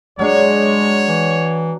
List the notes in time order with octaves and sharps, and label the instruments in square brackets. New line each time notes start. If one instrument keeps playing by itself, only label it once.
[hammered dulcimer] F#3 D4 [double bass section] G#3 [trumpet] C#5
[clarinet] E3